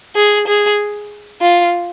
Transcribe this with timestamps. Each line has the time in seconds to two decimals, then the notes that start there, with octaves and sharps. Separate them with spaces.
0.16 G#4
0.48 G#4
1.42 F4